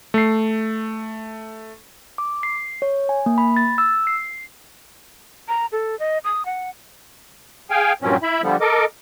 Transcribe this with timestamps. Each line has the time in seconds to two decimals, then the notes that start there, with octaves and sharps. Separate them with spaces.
0.14 A3 C7
2.18 D6
2.43 C7
2.82 C#5
3.09 G#5
3.26 A#3
3.38 B5
3.56 A6
3.78 E6
4.07 C7
5.48 A#5
5.72 A4
5.99 D#5
6.24 D#6
6.46 F#5
7.70 G#4 F5 G5 G#5
8.02 G2 A#2 F3 F#3 C4 C#4
8.23 E4 E5 B5
8.42 D3 F3 G3 B3
8.61 A4 A#4 D#5 D6